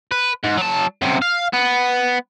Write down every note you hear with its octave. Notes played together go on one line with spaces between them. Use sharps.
B4
G#2
F#3 A5
F#2 C3
F5
B3